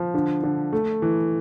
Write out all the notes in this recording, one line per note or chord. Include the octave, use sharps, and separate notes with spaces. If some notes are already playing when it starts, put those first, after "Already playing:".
Already playing: F3
D3
D3
A3
E3